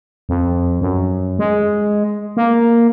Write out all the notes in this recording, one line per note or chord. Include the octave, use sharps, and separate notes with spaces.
F2
F#2
G#3
A#3